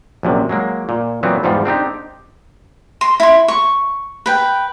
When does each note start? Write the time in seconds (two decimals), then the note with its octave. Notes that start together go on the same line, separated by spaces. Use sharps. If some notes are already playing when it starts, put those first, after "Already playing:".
0.23 A#1 F#2 C3
0.49 F#3 G#3 A#3
0.89 A#2
1.23 A#2 E3 F#3 B3 C4
1.43 E2 G#2 F3 G3 F4
1.65 C4 D4 D#4 G4
3.01 C6
3.20 E4 C6
3.48 C#6
4.26 B4 G5